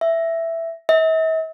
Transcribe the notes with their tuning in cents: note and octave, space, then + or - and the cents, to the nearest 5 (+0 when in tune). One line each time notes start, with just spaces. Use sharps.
E5 +5
E5 -45